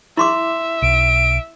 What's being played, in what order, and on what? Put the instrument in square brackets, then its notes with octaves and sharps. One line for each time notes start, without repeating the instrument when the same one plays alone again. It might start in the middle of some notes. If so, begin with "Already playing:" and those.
[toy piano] E4 C6 D6 [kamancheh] E5
[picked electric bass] B1 [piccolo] D7